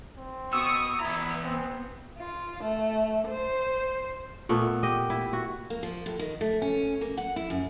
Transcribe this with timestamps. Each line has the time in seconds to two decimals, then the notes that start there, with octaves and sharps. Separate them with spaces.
0.17 C4
0.53 B2 C#6 D#6 E6
1.00 E3 B3 E4 A#5
1.44 C4
2.18 F4
2.63 A3
3.29 C5
4.49 A#2 A3 B3
4.83 G4 D#5
5.10 E4
5.33 F#4
5.70 A#3
5.83 F3
6.06 A2
6.19 D#3
6.41 A3
6.62 C#4
7.01 A#3
7.18 F#5
7.36 E4
7.50 F#2